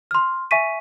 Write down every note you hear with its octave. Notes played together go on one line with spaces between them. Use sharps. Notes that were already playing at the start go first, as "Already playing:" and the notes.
C6 F6
E5 G#5 C#6 B6 D#7